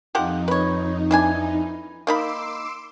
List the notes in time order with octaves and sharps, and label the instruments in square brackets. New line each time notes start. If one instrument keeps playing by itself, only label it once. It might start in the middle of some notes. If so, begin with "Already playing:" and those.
[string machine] F2 D#4 [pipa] F3 G4 F#5
[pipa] B4 C#5
E3 D4 G#5
[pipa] A#3 D#4 B5 [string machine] C6 D6 E6